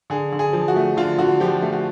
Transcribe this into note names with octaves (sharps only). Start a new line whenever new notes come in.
D3 G#4
D3
G#4
F3
F#4
A3
D3 F4
D3 F#4
F3 G4
A3
F#4